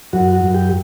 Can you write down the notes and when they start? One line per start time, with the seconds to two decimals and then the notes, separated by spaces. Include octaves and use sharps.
0.13 F#2 F#4
0.33 F#4
0.44 F#2
0.54 G4